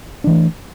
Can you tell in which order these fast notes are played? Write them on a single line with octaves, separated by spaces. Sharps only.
D4 E3 A3